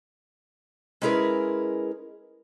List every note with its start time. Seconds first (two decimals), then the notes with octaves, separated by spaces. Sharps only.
1.02 G#3 C#4 E4 G#4 A#4 B4